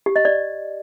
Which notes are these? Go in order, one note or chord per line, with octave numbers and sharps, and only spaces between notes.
G4
D#5
D5